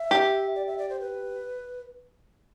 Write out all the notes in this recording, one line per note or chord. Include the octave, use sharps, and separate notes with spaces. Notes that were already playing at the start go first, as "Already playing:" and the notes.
Already playing: E5
G4
D5
E5
D5
C5
B4